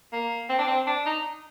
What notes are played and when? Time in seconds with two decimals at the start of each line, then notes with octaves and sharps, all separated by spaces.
0.12 A#3
0.49 C4
0.59 D4
0.67 C4
0.87 D4
1.06 D#4